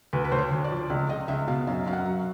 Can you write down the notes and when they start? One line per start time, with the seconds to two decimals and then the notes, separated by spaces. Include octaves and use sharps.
0.13 D2 B4
0.24 B4
0.32 D2 C5
0.38 C#5
0.52 D2
0.64 D5
0.71 F3
0.90 C#2 D5
1.09 C#2 D#5
1.28 C#2 E5
1.48 B2 F5
1.67 F#2 F5
1.86 F#2 F5
1.93 F#5
2.06 F#3